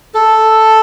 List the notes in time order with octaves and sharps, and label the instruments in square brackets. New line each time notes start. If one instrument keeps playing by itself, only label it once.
[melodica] A4